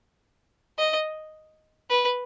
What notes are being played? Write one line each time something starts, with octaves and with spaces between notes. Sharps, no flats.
D#5
B4